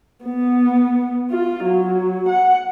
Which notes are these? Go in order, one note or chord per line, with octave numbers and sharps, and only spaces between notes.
B3
F4
F#3
F#5